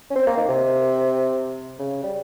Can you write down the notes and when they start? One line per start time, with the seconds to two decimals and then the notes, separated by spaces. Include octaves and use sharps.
0.11 C#4
0.15 C4
0.27 A#3
0.37 D#3
0.48 C3
1.79 C#3
2.03 G3